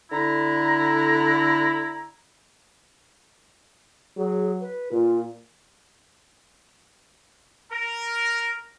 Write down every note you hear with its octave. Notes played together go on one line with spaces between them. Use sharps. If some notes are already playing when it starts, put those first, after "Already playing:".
D3 E4 A#5
F#3 G#4
B4
A#2 F4
A#4